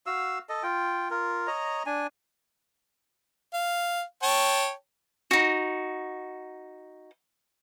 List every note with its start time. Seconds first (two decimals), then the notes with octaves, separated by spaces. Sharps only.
0.06 F#4 F5 E6
0.49 A4 D#5
0.63 F4 G5
1.10 F4 A#4
1.47 C#5 D#5 A#5
1.86 D4 G#5
3.54 F5
4.23 C#5 G5 A5
5.31 D#4 F#4